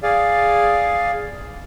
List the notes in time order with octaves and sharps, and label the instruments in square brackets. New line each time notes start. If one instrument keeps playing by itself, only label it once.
[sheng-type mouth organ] G#4 D5 F5